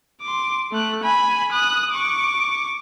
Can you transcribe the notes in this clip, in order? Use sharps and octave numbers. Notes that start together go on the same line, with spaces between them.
C6 D6
A3 F#6
G#5 B5
D#6 F#6
C#6 D6